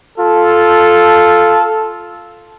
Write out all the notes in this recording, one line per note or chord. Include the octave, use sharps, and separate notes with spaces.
F4 A4